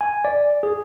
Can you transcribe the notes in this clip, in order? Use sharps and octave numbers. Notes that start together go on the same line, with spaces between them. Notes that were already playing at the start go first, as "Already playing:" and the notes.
G#5
D5
G#4